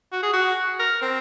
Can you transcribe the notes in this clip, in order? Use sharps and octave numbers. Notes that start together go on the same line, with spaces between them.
F#4
G#4
F#4
A#4
C4